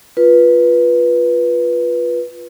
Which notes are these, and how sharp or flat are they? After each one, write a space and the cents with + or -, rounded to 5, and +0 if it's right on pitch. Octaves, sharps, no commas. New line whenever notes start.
F4 +0 B4 -15